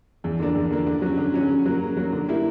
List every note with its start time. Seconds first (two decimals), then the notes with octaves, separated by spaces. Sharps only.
0.24 E2
0.39 D3 A#3 D4
0.55 E2
0.71 D3 A#3 D4
0.87 D3
1.02 F#3 C#4
1.18 D3
1.34 F#3 C#4
1.49 C#3
1.66 F#3 A#3
1.81 C#3
1.97 F#3 A#3
2.12 D3
2.28 G3 A#3 E4